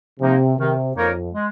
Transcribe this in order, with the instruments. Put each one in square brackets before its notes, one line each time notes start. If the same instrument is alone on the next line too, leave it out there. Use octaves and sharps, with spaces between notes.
[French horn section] C3 [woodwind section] F3 A#3 D#4
[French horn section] C3 [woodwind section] D#3
[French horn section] F2 [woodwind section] A#3 D#4 A#4 C#5
[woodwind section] G#3